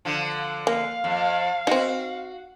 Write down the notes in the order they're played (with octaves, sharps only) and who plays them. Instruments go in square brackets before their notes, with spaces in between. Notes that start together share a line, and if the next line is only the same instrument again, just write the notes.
[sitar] D3 F3
[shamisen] A#3 [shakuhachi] F5
[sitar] F2
[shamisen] C4 D#4 [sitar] F#4